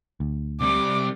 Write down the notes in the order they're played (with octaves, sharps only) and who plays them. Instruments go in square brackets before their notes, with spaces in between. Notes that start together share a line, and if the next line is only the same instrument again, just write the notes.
[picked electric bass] D2
[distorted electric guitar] C2 G3 [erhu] D6